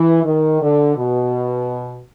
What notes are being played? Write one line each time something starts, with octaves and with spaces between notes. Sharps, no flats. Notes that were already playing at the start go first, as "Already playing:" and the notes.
Already playing: E3
D#3
D3
B2